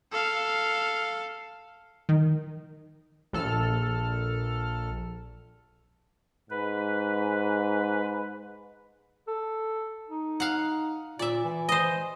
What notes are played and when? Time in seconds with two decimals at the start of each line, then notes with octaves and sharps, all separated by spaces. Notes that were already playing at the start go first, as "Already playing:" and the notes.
0.12 A4 F5
2.09 D#3
3.33 A#1 A4 F6
6.50 G#2 B4
9.28 A4
10.09 D#4
10.40 F5 F#5
11.19 A#2 D5 E5
11.44 E3
11.69 C5 D#5